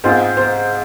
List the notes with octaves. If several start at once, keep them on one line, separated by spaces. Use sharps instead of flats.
G#2 G#3 C4 F4 G#4 C5
C5